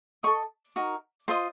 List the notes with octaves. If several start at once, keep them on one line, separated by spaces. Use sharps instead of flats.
A4 D#5 C#6
D#4 F#4 A#4
F4 C5 D#5 C6